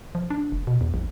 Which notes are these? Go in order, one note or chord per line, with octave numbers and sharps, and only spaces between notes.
F3
D4
F#1
B2
E2
A#1